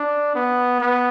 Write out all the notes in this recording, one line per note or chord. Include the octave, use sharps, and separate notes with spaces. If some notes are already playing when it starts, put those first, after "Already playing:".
Already playing: D4
B3
B3